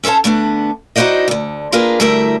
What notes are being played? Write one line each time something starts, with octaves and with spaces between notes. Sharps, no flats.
C#4 A4 C5 C#5 A5
D3 A3 B3 D4
D#4 E4 F#4 C5 D5 D#5
D2 D3
A#3 D4 F4 G#4 A#4 B4
D2 G3 A3 E4 A#4 E5